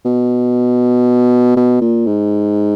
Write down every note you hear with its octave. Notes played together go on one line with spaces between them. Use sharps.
B2
B2
A#2
G#2